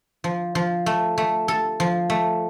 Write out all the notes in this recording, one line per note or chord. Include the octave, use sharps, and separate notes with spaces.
F3
F3
A3
A3
A4
F3
A3